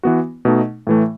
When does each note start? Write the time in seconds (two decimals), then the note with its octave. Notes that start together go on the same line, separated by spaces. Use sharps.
0.03 E3 B3 F#4
0.45 B2 A3 D#4
0.87 A2 E3 A3